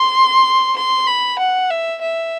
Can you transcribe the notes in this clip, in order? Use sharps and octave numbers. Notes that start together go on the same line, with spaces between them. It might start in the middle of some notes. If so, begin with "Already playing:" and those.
Already playing: C6
C6
B5
F#5
E5
E5